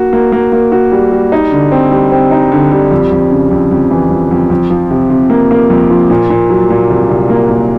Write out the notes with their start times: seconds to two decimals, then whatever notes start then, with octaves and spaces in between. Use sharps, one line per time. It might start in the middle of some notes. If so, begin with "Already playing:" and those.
Already playing: A#3 F#4
0.13 A#3
0.32 A#3
0.52 A#3
0.72 F#4
0.92 G3
1.12 G3
1.32 D#4
1.52 D3
1.72 C4
1.91 G3
2.12 C4
2.31 D#4
2.52 D3
2.71 G3
2.91 F2
3.11 F2
3.31 C#3
3.51 F2
3.71 F2
3.91 E3
4.10 F2
4.31 F2
4.50 F2
4.70 F3
4.91 C3
5.10 C3
5.30 A#3
5.51 A#3
5.70 F2
5.90 F3
6.10 A#2
6.30 A#2
6.50 F#3
6.70 A#2
6.90 C2
7.09 C2
7.30 A#3
7.50 A#2